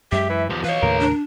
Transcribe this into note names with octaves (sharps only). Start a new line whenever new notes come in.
F#2 G#3 G4 E5
E3
E2 E3 F3 G4
E3 B4 C#5 F5
D#2 A2 C#3 A#4
D4